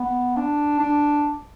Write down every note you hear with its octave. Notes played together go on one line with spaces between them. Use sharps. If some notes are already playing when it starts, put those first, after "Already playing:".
Already playing: B3
D4
D4